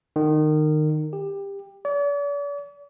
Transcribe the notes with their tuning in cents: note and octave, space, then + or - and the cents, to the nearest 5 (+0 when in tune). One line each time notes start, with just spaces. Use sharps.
D#3 -25
G4 +20
D5 -45